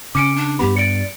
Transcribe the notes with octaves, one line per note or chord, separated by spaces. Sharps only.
C#3 C#4 D6 C#7 D7
D4
G2 B3 G4 B5
D5 C#7 D7